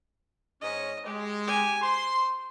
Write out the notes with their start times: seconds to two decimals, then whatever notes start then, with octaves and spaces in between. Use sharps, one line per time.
0.61 G#2 C#4 D#5
1.06 G#3 G4
1.47 G4 G#5
1.82 C5 C6